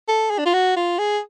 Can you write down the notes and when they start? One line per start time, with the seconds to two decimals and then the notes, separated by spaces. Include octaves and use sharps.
0.08 A4
0.31 G#4
0.38 D4
0.46 F4
0.53 F#4
0.77 F4
0.99 G#4